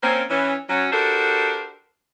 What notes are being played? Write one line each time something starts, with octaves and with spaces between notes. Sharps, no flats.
A#3 C4 C#4
E3 C#4
F#3 C#4
D4 F#4 G4 A4 A#4 C5